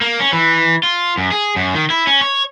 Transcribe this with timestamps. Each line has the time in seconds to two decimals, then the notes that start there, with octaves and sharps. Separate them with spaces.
0.01 A#3
0.20 C#4
0.33 E3
0.83 F4
1.18 F#2
1.32 G#4
1.56 F#2
1.75 D#3
1.90 E4
2.07 C#4
2.21 C#5